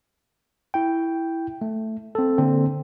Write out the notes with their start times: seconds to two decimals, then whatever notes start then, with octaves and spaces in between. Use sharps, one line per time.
0.74 E4 G5
1.61 A3
2.15 C4 A4
2.38 D3 A#3 C4